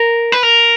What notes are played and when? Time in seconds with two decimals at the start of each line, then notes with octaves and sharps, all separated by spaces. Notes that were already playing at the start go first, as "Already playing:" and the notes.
Already playing: A#4
0.32 B4
0.43 A#4